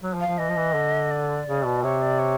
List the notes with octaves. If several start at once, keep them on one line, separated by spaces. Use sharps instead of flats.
F#3
F3
F5
F3
E3 D#5
F3
E3
D3
D5
C#3
B2
C3 C#5
D5
C#5